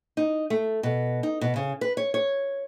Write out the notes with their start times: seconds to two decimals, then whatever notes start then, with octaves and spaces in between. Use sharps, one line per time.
0.17 D#4
0.50 A3
0.83 B2
1.23 D#4
1.41 B2
1.56 C#3
1.81 B4
1.97 C#5
2.14 C#5